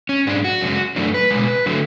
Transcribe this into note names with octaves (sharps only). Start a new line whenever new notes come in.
C#4
G#2 G#3 D4
F#4
F#2 C#3 G#3
F#2 E3 A3 D4
B4
B2 G#3
D3 F#3 A3